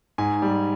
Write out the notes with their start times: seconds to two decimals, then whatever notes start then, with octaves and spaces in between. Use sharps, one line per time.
0.18 G#2 G#5
0.42 G3